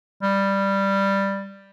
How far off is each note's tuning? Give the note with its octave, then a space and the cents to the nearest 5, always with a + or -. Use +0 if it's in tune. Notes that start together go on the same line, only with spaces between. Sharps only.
G3 +5